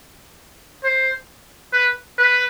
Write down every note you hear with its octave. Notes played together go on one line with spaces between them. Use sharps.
C5
B4
B4